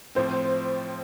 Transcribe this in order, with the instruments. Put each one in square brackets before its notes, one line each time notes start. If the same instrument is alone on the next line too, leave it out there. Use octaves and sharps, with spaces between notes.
[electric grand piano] A2 F3 C4 [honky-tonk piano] C5